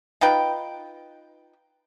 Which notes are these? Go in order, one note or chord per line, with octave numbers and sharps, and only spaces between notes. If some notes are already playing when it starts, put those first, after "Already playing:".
D#4 F4 B4 G5